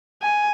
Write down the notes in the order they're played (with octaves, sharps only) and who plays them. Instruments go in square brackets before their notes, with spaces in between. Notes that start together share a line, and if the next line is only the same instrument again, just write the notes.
[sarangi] G#5